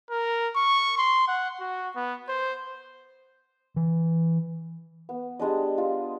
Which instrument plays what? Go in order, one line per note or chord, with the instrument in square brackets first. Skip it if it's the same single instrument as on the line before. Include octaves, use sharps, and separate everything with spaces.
[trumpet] A#4
C#6
C6
F#5
F#4
B3
C5
[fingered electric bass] E3
[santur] B3
G3 G#3 D4 D#5
F4